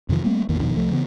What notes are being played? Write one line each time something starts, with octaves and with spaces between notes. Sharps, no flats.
F2 C3 D#3 F3
G3 A3 A#3 C4
A1 E2 D#3 A#3
E1 F2 B2 D#3
C2 F3 A3
C#3 E3 B3